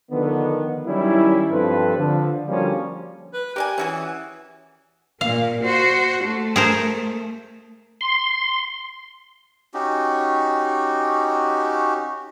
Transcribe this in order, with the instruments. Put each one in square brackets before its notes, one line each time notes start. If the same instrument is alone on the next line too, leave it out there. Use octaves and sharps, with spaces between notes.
[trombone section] D3 D#3 F3 B3
D#3 F#3 G3 C#4 E4
G2 F3 C4 A4 B4 C5
D3 F3
D3 F3 G3 A#3 C#4 F#4
[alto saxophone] B4
[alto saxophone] G4 [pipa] A#4 D5 G#5
[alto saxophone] E3 [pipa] C#4 F#4 G#4
[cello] A#2 A#3 [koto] F5
[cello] F#4 C5
A3
[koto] G#4 A#4 C5
[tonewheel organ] C6
[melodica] C#4 D#4 F#4 G4